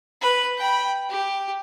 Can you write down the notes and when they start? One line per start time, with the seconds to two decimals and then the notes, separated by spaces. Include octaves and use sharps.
0.21 B4
0.57 G5 B5
1.10 G4